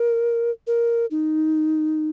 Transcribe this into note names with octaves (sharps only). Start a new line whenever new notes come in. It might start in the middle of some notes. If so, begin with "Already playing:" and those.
Already playing: A#4
A#4
D#4